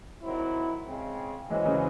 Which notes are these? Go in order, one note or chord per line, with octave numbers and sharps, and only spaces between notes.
D#3 F#3 C4 E4
C#3 G#3 C4
E3 F#3 G#3 C#4 E4 C5 D#5
C#3 E3